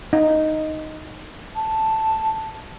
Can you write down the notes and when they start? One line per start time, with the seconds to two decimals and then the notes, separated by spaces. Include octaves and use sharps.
0.13 D#4
1.55 A5